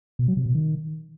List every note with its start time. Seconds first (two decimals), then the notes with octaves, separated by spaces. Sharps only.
0.19 B2
0.28 F#3
0.37 C3
0.46 B2
0.55 D#3